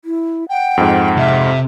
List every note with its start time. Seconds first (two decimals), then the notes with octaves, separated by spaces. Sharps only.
0.05 E4
0.49 F#5 G5
0.77 F2 G#2
1.17 C3 E5